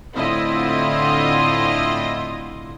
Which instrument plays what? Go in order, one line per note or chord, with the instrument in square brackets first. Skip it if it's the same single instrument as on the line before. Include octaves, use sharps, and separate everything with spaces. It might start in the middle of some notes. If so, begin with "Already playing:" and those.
[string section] A2 D3 C4 E4 F4 D#5